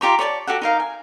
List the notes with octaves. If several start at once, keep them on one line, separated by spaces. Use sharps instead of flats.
F4 G4 A#5 C#6
C#5 D5 G#5 A5
F#4 G4 A4 F#5
D#4 A#4 F5
G#5